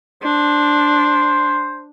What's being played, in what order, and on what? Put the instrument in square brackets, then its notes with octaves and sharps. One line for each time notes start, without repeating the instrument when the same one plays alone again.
[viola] D4 [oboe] C5